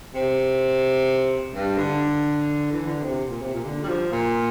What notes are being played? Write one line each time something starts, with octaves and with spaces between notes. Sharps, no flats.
C3
G2
D3
E3
D3
C3
A#2
C3
A#2
D3
G3
F3
A#2